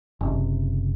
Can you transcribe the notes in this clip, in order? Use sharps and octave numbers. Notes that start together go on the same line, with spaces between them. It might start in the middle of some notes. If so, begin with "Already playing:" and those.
F#1 C3